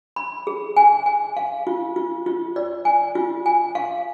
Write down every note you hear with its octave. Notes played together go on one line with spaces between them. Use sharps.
B5
G#4
G#5
G#5
F5
F4
F4
F4
D5
G#5
F4
G#5
F5